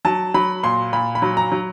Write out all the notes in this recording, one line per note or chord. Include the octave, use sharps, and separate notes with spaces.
F#3 A5
F#3 B5
A#2 C6
A#2 B5
B5
F#3
A#5
F#3